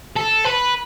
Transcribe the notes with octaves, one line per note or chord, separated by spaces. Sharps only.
A4
B4